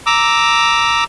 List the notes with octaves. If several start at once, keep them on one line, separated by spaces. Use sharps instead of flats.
A#5 D6 E6